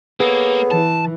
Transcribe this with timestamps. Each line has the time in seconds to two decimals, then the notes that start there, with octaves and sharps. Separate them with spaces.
0.20 A#3 B3 G#4 A4 C#5
0.71 E3 A5